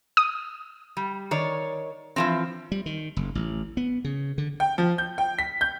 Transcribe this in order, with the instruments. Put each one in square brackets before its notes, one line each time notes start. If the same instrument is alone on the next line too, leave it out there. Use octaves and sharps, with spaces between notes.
[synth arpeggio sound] D#6
[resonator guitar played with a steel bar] G3
D#3 C#5 D5
E3 F3 C4
[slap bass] G3
D#3
F#1
A1
B3
C#3
D3
[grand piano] G5
F3
G6
G5
B6
G6